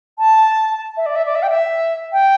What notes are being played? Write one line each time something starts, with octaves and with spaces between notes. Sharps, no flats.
A5
E5
D5
E5
D5
E5
G5
E5
G5